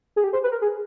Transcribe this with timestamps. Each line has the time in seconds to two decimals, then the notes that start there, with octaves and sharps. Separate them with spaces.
0.16 G#4
0.24 G4
0.33 C5
0.43 B4
0.52 A#4
0.62 G#4